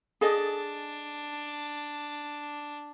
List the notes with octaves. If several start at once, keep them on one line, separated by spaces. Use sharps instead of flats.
D4 G#4 A4 D#5